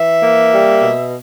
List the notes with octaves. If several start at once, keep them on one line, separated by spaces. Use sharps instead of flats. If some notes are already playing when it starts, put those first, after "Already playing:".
Already playing: E3 E5
A#3
G3
B2